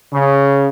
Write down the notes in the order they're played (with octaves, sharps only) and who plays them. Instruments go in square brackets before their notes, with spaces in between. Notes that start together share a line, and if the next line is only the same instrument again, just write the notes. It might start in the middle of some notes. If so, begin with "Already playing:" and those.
[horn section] C#3